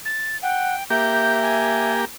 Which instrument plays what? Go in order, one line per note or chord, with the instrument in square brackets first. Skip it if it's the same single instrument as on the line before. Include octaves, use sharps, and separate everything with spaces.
[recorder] A6
[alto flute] F#5 [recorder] G5
[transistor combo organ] A#3 G4 [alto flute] E5 [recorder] G6
[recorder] G#5